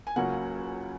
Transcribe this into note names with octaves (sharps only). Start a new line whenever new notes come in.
G#5
C#2 C#3 F#3 A#3 C#4 F#5